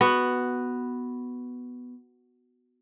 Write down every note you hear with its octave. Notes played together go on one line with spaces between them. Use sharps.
B3 F#4